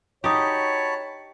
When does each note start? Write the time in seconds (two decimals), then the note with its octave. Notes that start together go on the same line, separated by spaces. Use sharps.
0.24 D#4 F#4 G4 C#5 A5 B5